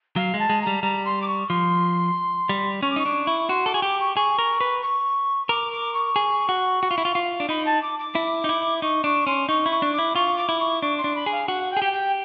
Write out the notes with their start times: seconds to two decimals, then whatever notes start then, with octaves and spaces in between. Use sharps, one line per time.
0.16 F#3 F5
0.34 G#3
0.39 A5
0.49 G#3
0.62 A#5
0.67 G3
0.83 G3 A#5
1.05 C6
1.22 D6
1.28 C#6
1.49 F3 C6
2.49 G3
2.82 C#4 C#6
2.90 D6
2.96 D#4 C#6
3.06 D4
3.27 E4
3.49 F#4 C6
3.66 A4 D6
3.74 G#4 C#6
3.82 G4 D6
4.00 C#6
4.16 G#4 C#6
4.39 A#4
4.61 B4
4.83 C#6
5.49 A#4 D6
5.71 D6
5.94 C#6
6.16 G#4
6.49 F#4
6.83 F#4
6.91 F4
6.98 E4
7.05 F4
7.15 F4
7.40 D4
7.49 D#4 B5
7.66 A5
7.82 D6
7.99 D6
8.15 E4
8.44 D#4
8.49 E4
8.82 D#4 C#6
9.04 D4 C#6
9.27 C#4 C6
9.49 D#4 C#6
9.66 E4
9.71 C#6
9.82 D4
9.93 D6
9.99 E4
10.15 F4 C#6
10.38 D6
10.49 E4
10.60 C#6
10.82 D4 C#6
10.98 C6
11.04 D4
11.16 B5
11.26 G#4
11.32 F5
11.48 F#4 F#5
11.71 G5
11.77 G#4
11.82 G4
11.92 G5